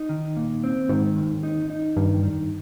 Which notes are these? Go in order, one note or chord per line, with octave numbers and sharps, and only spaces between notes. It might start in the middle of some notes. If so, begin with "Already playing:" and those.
Already playing: D#4
D#3
A#2
C4
G#2 D#3
D#2
D#4
D#4
G2 D#3
D#3